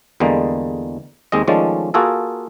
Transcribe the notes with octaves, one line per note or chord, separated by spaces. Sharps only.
E2 D3 G3 G#3 A#3
D#2 G#3 C4 D#5
D#3 F3 G#3 A3 C#4 D5
A#3 F4 F#4 G#4 A4